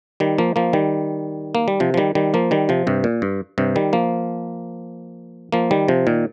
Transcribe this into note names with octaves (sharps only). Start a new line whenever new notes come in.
D#3 G3
F3 A#3
F3 A#3
D#3 G3
A#3
G3
C3 F3
F3
D#3 G3
D#3 G3
F3 A#3
D#3 G3
C3 F3
G2 C3
A#2
G2
G2 C3
D#3 G3
F3 A#3
F3 A#3
D#3 G3
C3 F3
A#2 D#3